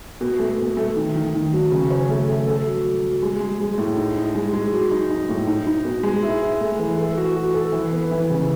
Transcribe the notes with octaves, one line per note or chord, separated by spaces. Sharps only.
B2
A3
B2
A3
D#3
D#3
D#3
F#3
C#3
C#4
A3
A3
A4
F#3
F#3
F#3
G#3
G#3
G#3
A2
D#4
D#4
G#3
G#3
F#3
D#4
D#4
A2
D#4
D#4
B2
G#3
E4
E4
A3
E3
A4
F#4
F#4
A4
E3
B3
E3
C#3